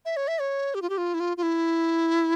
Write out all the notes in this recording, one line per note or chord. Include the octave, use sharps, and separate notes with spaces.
E5
C#5
E5
C#5
G4
F4
G4
F4
E4
F4
F4
E4